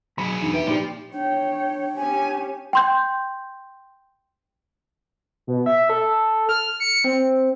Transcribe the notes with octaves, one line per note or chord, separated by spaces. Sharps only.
B1 F#3 G#4 B5
E2 B2 D4 D#4
G4 B4 E5
A#2 F3 D#4 G4 D5
D4 C#5 G5
C#4 G4 G#5
G5 C6 G6
B2
E5
A4
F6
C#7
C4